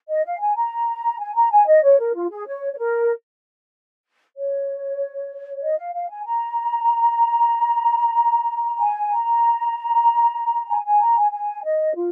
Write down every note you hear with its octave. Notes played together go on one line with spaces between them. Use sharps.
D#5
F5
G#5
A#5
G#5
A#5
G#5
D#5
C#5
A#4
F4
G#4
C#5
C#5
A#4
C#5
D#5
F5
F5
G#5
A#5
G#5
A#5
G#5
G#5
A#5
G#5
G#5
D#5
F4